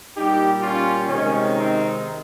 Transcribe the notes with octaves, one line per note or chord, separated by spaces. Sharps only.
A#2 G3 D#4 G4
C#4 F4
C3 D#3 G#3 C#4
C4 D#4